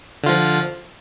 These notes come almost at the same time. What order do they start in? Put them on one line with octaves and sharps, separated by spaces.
D3 F4 F3